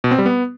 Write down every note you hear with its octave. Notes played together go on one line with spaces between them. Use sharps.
B2
C4
G3
B3